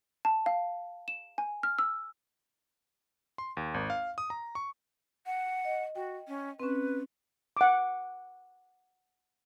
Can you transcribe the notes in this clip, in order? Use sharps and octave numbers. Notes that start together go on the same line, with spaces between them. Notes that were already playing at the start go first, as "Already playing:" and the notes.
A5
F5
E7
G#5
F6
E6
C6
D#2
G#1
F5
D#6
A#5
C#6
F#5
D#5
F#4 G5
C#4
C4 C#4 B4
F#5 D6